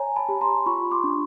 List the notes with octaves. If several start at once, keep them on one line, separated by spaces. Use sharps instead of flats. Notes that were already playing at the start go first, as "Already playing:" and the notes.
Already playing: C#5 G#5 A#5
A5 B5
G4
A#5 C6
F4 B5 C#6
C6 D6
D4